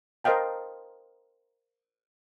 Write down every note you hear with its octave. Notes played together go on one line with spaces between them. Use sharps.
A#4 C5 D#5 F5 G5 A5